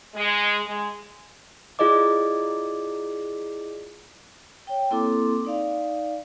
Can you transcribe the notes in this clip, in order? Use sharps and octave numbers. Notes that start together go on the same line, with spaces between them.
G#3
G#3
E4 F4 G#4 D5 D#5 D6
C#5 G5
A#3 C4 E4 A4 C6 D6
D#4 D5 F5